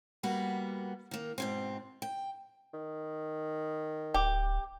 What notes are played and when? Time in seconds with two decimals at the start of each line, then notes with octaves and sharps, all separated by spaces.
0.23 G3 A#3 B3 F#4
1.11 D#3 A#3
1.38 G#2 B2 C4
2.02 G5
2.73 D#3
4.14 D1 G4